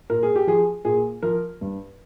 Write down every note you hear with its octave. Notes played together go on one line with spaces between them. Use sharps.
A#2 A#4
G#4
G4
F3 G#4
A#2 G#4
F3 A#4
G2